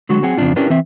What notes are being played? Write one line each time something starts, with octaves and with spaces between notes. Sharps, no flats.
D3 F#3 G#3 F#4
F#3 C4 G#4 F#5 G#5
F2 C#3 G#3 C4 D4 F4
C#4 D4 E4 G4 A#4 B4
E3 C4 E5